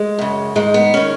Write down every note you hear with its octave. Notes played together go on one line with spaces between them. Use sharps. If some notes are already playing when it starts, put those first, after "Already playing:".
Already playing: G#3
F#2 C#3
G#2 D#3 G#3
B3
D#3 C#4